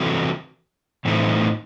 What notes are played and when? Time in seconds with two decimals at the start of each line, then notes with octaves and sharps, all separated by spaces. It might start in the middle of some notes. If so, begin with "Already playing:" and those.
Already playing: C3 E3 C4 F#4 A4
1.05 A2 E3 A3 C4 D#4